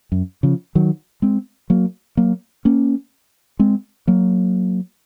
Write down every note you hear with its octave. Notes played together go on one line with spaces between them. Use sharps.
F#2
C#3 F3
D#3 F#3
G#3 C4
F#3 A#3
F#3 A#3
A#3 C#4
G#3 C4
F#3 A#3